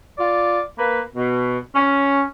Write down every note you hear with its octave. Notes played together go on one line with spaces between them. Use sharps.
F4 D5
A#3 B4
B2
C#4